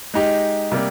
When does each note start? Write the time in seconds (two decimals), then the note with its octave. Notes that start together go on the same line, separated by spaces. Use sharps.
0.14 G#3 D#4 G4
0.72 C3 G3 A#3